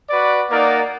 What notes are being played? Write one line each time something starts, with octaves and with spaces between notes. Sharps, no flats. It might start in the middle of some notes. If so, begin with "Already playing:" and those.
F#4 B4 D5
A#3 D#4 A#4 D5 F#5